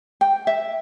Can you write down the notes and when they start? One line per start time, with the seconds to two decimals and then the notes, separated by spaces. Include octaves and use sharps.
0.21 G5
0.47 E5